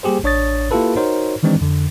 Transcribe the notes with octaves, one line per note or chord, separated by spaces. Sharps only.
G3 A#3 G4 G#4 C5
A1 D4 C#5 D#6 A6
A#3 E4 F4 G4 A4 B4
D#4 F#4 A#4 C5 C#5
D#3 E3 G#3 C4 D4 D#4
F2 D3